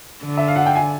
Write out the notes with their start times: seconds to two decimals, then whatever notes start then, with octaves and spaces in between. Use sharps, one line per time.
0.24 D3
0.37 E5
0.48 F5
0.56 F#5
0.66 G5
0.75 G#5